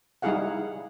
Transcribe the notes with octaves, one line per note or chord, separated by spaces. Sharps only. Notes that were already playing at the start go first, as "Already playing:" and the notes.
G3 D#4 E4 G#4 F5 F#5